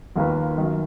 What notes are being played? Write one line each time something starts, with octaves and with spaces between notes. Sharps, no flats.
D#2 D#3 A#3 F4 B4
F#2 D#3